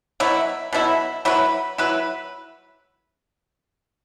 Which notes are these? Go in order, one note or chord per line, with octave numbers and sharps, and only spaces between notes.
B2 F#3 E4
B2 F#3 E4
F#3 E4 B4
F#3 E4 B4